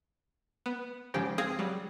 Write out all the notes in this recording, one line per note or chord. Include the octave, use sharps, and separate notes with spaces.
B3
G#1 G#2 C#3 F3 G4
C4 G#4 F5 D#6 G#6 A#6
F#3 G3